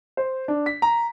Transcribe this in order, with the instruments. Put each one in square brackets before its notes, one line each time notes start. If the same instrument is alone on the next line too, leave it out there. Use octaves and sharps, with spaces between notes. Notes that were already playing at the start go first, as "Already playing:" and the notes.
[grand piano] C5
D4
B6
A#5